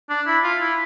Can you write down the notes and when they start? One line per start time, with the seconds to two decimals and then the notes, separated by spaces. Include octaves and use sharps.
0.09 D4
0.27 E4
0.44 F4
0.61 E4